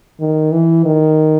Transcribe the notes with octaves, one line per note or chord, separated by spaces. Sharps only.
D#3
E3
D#3